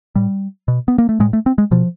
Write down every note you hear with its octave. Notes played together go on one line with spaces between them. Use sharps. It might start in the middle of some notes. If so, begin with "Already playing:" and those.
A2 G3
B2
B3
A#3
A3
A2 G#3
A3
C4
G#3
B2 F3